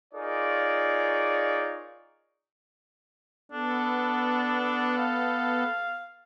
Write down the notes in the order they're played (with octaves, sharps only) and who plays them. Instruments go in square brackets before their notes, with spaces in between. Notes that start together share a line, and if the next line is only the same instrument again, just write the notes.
[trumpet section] D#4 F4 G#4 A#4 C#5 D5
[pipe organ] B3 A4 [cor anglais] D4
[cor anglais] F5